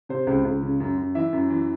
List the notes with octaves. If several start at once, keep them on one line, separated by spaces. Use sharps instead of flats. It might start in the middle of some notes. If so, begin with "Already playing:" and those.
C3 C5
C#2
C#2
C#3
F#2
F#2
E3 E5
F#2
E3